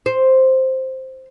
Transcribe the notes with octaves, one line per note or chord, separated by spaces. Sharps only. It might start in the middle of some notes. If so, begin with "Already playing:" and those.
C5